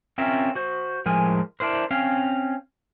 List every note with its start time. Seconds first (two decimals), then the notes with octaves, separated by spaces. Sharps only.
0.18 C4 C#4 F4 A#4 E5
0.55 F#4 C5
1.06 A2 F3 G#3 A#4 G#5
1.60 D4 E4 A#4 C5
1.91 C4 C#4 F5